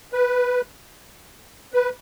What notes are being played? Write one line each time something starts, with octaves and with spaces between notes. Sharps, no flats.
B4
B4